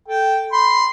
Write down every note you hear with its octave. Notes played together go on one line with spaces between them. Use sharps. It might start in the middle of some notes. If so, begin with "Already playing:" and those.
A4 G5
B5 C6